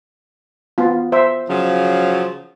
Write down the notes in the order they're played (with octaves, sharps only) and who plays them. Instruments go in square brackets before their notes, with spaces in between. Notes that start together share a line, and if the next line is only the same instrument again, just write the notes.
[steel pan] B3 F4
C5 E5
[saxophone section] C#3 F3 F#3